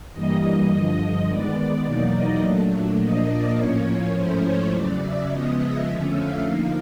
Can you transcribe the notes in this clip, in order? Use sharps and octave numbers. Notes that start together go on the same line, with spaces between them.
G2 E3 G3 A#3 D#5
G2 D3 F3
D#3 G#3 B3 D5
E2 B2 F#3 A#3 D#4
D#5
A#2 F#3 A3 D4
A#2 F3 A#3 D4 D#5
D5
A2 F3 A#3 C#4 C#5
G#2 F3 A3 C#4 E4 C5
C#5
E2 C#3 F#3 D5
E5
C#3 F3 G#3 B3 D#5
E5
F2 D3 F3 A3 C#4 E5
F5
D3 F3 A#3 D#4 F5